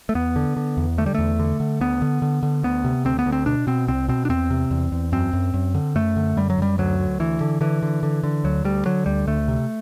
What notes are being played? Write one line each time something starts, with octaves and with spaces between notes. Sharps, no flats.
A3
E2 B3
D3
D3
E2
D3 A3
G3
E2 A3
D3
D3
D2 B3
D3
D3
D3
D2 B3
C3
D2 C4
B3
D2
C4
B2 D4
B2 C4
C2 C4
B2 C4
D4
E2 C4
C3
E2
E2
F#2 C4
F#2
F#2
D3
F#2 A3
D3
F#2 G3
F#3
F#2 G3
D2 F#3
D2
D2 E3
D3
D3 E3
D3
D3
D3
D2 F#3
D2 G3
D3 F#3
D2 G3
D2 A3
C3